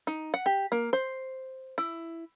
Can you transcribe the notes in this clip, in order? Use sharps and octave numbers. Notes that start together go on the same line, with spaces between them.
D#4
F#5
G4
A#3
C5
E4